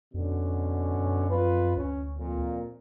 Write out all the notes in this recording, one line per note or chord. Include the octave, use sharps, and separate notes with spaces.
F2 B2 D3 C#4
F#2
F2 F4 B4
D2 C#4
F2 A#2